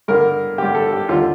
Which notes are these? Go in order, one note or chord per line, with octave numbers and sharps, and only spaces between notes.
G2 D3 A#4
G2 D3 G4
A4
G4
D#2 D3 F4